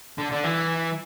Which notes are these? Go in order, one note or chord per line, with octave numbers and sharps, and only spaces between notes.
D3
D3
E3